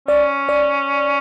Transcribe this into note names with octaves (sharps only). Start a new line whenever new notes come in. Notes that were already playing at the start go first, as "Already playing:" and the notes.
C#4 D5
D5